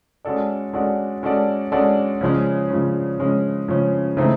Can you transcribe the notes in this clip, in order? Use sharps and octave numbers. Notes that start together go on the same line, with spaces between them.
G#3 C#4 F#4 A4 D5
G#3 C#4 F#4 A4 D5
G#3 C#4 F#4 A4 D5
G#3 C#4 F#4 A4 D5
C#3 F3 G#3 C#4
C#3 F3 G#3 C#4
C#3 F3 G#3 C#4
C#3 F3 G#3 C#4
C#3 E3 A3 C4 D#4